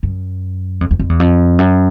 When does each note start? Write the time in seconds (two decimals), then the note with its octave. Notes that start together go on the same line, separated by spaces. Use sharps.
0.03 F#2
0.81 F2
0.91 E2
0.99 F2
1.10 E2
1.20 F2
1.59 F#2